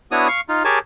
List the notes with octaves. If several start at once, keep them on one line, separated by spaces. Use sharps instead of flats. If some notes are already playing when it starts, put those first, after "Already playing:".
B3 D4 E4 F#4 C#5 D#6
F5 C#6
D#4 F4
G4 G#4 A#4 C#5 G#5 A5